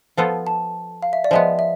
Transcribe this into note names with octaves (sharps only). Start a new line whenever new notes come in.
F3 B3 F4 A4
A5
F5
E5
D5
F3 G#3 B3 E5
E5